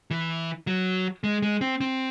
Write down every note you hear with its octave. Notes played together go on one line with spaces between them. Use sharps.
E3
F#3
G#3
G#3
C4
C4